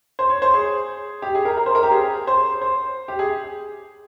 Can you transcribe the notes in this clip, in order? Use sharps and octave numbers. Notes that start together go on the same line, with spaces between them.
C5
C#5
C5
G#4
G4
G#4
A#4
A#4
C5
A#4
G4
G#4
C5
C5
G4
G#4